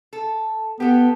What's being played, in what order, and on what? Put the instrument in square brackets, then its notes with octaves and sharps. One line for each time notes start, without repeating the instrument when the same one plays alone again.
[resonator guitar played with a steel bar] A4
[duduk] B3 [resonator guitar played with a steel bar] G4 A4